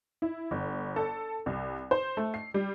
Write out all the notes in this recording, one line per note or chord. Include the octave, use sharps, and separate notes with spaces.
E4
G1
A4
C2
C5
A3
C7
G3